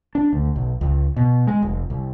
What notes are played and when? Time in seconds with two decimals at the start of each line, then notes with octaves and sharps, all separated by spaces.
0.15 D4
0.33 D2
0.56 B1
0.81 C#2
1.17 B2
1.47 G#3
1.63 F1
1.90 C2